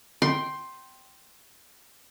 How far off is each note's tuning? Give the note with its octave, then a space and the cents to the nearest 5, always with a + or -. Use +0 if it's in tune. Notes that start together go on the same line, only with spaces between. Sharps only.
G5 -10 C6 +10